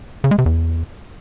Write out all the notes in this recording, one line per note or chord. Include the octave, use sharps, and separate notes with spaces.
C#3
G#3
C3
E2